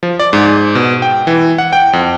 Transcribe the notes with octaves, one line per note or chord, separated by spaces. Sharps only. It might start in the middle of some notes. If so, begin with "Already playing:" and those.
F3
D5
G#2
B2
G5
E3
F#5
G5
F2